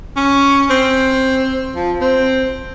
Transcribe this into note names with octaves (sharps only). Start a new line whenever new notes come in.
C#4
C4
F3
C4